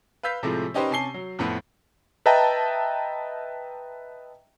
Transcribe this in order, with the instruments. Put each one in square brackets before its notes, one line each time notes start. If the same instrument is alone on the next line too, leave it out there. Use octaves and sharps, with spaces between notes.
[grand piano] B4 F5 E6 G6 B6
A2 C3 F3 G#3 A3
C#4 D#4 G4 B4 C5
C3 C#4 G#5 A5 C7 G7
F#3
F2 A2 B3
[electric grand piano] B4 D#5 E5 G5 A5 A#5